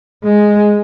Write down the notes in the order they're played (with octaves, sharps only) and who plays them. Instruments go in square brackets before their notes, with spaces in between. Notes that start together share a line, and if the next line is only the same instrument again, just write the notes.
[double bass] G#3